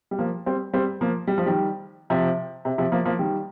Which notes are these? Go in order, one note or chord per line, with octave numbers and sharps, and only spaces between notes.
G3
F3 A#3
G3 C4
G3 C4
F3 A#3
G3
F3
D#3 G3
C3 F3
C3
C3 F3
F3 A#3
F3 A#3
D#3 G3